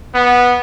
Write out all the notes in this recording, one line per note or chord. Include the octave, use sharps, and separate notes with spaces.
B3